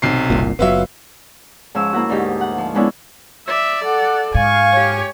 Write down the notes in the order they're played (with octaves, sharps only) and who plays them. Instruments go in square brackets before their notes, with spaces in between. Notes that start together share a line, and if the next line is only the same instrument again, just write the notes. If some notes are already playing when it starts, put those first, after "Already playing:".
[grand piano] B1 C3 C7
[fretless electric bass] F#1 C2 A#2
[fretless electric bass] F#1 F#3 [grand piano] B3 F4 E5
[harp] G#2 F3 C#4 E6
A#3 E4 F#4
D2 G#2 D#4 G4
F#5
F3
G#3 B3 C#4 D4 E4
[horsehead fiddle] D5 [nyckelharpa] E5
[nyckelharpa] A4 [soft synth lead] F#5
[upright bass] G#2 [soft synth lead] F5 [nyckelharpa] G#5 C#6
[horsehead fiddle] G4 C#5